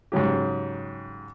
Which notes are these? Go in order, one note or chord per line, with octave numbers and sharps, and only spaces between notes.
G#2 C#3 F#3 G4